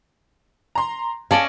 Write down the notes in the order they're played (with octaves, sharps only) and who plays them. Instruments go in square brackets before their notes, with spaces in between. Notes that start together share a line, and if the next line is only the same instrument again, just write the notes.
[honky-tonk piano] A#5 C6
[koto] C#4 D5 D#5 [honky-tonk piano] G#4 [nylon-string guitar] F5 A5